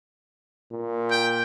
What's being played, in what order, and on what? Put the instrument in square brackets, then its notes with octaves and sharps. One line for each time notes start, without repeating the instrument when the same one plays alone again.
[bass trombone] A#2
[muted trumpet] G5